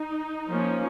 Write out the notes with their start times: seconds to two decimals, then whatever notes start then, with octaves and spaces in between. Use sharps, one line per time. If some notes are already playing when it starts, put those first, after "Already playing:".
Already playing: D#4
0.48 F3 A#3 C#4